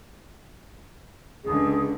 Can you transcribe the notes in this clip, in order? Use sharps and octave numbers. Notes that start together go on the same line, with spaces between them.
C#2 D3 G#4